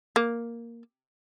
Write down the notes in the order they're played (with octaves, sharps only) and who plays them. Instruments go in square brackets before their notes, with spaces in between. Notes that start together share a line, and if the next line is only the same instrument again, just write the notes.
[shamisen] A#3